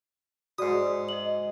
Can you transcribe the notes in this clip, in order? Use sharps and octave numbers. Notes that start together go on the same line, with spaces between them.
G#2 F#4 D5 D#6
D#5 F#7